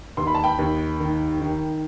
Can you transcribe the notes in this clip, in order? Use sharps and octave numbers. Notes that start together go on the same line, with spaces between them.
D#2 C6
B5
A5
G5 B5
D#2
D#3
D#3